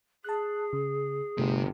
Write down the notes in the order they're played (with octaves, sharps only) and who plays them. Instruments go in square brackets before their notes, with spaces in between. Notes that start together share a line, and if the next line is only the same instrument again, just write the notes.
[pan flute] G#4 [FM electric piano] A5 F#6
[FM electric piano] C#3
[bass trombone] G1 [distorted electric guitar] C3 [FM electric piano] A3